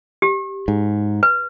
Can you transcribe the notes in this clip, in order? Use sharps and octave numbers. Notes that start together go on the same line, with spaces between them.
G4
G#2
B4